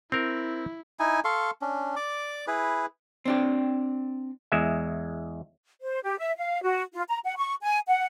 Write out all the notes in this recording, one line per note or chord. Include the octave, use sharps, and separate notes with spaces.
C4 E4 A#4
D#4 E4 G#5
A4 F5 C6 C#6
C#4 D4
D5 D6
E4 G#4 B4
C4 D4 G4
E2 G#3 E5
C5
G4
E5
F5
F#4
F4
A#5
F#5
C#6
G#5
F#5